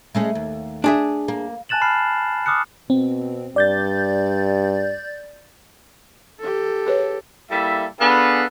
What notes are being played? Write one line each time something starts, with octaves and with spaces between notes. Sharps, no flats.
G#3 A3 C#4
D#2
D4 G#4 E5
A#3
G#5 A5 F#6 A6 E7 F#7
A5 B5 F6 C7
D6 D#6 F6 F#6 C#7
B2 C4
G2 D5 G6 A6
G4 A4
G#4 B4 C#5
G3 A#3 E4 A4 E5
B3 D4 G#4 A4 B4 F5